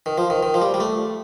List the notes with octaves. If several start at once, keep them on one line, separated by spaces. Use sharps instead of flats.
D#3
F3
D#3
D#3
F3
G3
G3
A3